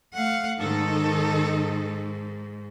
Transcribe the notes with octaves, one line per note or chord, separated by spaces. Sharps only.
A3 F5 F#5
G#2 D#3 D#4 A4